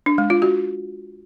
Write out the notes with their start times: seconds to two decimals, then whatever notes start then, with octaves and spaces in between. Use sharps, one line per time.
0.06 D4
0.18 G#3
0.30 F4
0.42 F#4